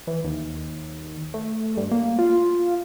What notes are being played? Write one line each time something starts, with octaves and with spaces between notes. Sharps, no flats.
E3
D#2
A3
G2
A#3
F4